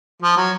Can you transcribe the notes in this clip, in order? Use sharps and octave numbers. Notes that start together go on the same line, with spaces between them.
F3
F#3